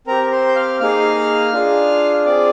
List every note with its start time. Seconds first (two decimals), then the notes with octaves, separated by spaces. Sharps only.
0.07 C4 G4 A#4 A#5
0.27 A#5
0.32 C5 C6
0.48 G6
0.56 F5 F6
0.80 A#3 D#4 G#4 F5 F6
1.52 D4 F4 G#4
2.26 C4 F4 G#4 D5 D6